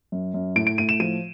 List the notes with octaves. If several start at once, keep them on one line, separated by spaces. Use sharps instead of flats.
F#2
F#2
A2 D7
D7
A2 D#7
E7
F3 D#7